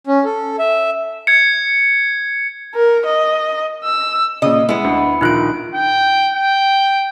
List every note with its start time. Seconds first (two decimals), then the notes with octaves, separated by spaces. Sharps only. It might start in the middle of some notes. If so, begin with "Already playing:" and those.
0.07 C#4
0.24 A4
0.59 E5
1.27 G#6 C#7
2.75 A#4
3.05 D#5
3.84 E6
4.42 A#2 C#3 D#5
4.69 G#3 B3 E4
4.84 D2
5.21 A#1 D#3 D#4 F4 F#6 D7
5.75 G5
6.34 G5